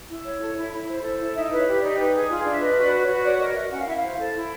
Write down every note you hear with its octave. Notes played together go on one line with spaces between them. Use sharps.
E4
C#5
A4
E4
E4
C5
A4
E4
D#4 E5
B4
C#5
G4
D5
D#4
B4
G#4
F4
D4
E5
B4 D#5
F#4
D5
B4
C#5
F#4
C#5 D5
A#4 D#5
F#4 E5
C#4 F#5
F5
E4 E5
F5
C5
A4
E4